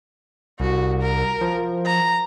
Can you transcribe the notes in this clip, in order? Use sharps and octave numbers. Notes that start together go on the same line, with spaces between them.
C2 F#4
A#4
F3
A#5